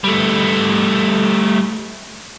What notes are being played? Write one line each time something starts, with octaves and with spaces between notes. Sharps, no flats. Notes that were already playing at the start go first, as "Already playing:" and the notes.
G3 A3